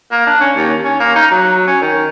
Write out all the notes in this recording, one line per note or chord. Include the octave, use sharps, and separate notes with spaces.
A#3
D4
C#4
D#2
C#4
A#3
D#4
F#3
C#4
D#3